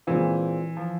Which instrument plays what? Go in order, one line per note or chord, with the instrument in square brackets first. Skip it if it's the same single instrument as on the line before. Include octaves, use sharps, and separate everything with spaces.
[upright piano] A#2 G#3 C4 F4 [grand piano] E3
[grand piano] F3